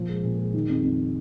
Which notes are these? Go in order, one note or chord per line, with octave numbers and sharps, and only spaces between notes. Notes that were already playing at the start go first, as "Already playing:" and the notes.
Already playing: A#2 F3
G#3
A#2
G#3
D#3
F2
F2